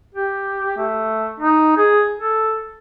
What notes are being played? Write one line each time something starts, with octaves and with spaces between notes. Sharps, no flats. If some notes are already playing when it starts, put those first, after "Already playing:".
G4
A3
D#4
G#4
A4